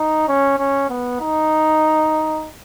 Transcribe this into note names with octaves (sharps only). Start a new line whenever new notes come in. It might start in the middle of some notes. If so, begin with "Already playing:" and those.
Already playing: D#4
C#4
C#4
B3
D#4